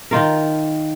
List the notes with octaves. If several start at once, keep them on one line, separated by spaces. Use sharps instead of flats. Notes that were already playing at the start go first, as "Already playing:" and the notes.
D#3 F4 A#4